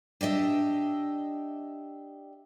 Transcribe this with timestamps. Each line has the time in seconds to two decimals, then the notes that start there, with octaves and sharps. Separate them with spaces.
0.21 D4 G4 D#5 E5